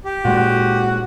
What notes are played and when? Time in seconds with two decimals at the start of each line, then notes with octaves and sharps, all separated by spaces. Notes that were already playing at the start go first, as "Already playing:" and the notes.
0.05 G4
0.25 A#2 G#3 F#4